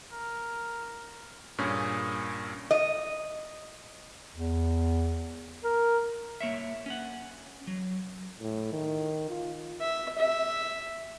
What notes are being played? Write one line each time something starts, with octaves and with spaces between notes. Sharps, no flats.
A#4
G2 A#2 C#4 G#4
D#5
E2
A#4
A#3 C#5 E5
C#4 F#5
F#3
A2
D#3
F4
E5
E5